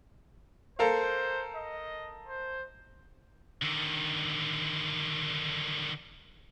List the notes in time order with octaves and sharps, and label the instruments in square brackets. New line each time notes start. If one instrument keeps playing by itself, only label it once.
[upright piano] A4 A#4 F5 [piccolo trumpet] C5
[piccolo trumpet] D#5
C5
[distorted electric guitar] D3 D#3